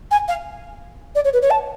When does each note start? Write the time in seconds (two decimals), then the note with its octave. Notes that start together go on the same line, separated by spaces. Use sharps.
0.11 G#5
0.28 F5
1.15 D5
1.24 C#5
1.33 B4
1.42 C#5
1.50 A5